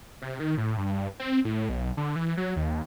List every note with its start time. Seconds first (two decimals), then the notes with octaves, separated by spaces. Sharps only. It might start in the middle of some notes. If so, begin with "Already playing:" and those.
0.22 C3
0.40 D#3
0.58 A2
0.78 G2
1.20 C4
1.45 A2
1.69 B1
1.97 D3
2.16 E3
2.37 F#3
2.56 D#2